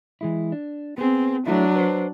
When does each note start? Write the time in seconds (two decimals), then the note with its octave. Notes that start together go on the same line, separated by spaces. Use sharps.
0.21 E3 G#3 E4
0.52 D4
0.98 B3 C4 G#4
1.46 F#3 A3 D4 E4
1.76 B4 C5